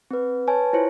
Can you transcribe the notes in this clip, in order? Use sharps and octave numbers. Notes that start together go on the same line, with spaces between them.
C4 B4
B4 C#5 G#5 A5
E4 F4 C5 C#5